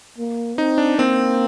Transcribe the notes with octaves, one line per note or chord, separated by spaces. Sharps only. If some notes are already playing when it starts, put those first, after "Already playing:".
A#3
C4 D#4
D4
A#3 C4